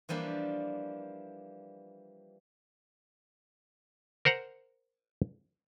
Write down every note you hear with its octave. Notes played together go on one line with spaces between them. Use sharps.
E3 F3 G3 A#3 D4
A#4 C5 F#5 A#5